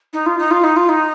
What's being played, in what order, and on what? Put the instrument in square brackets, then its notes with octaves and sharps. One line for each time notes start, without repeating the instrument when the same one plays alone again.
[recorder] D#4
F4
D#4
F4
D#4
F4
D#4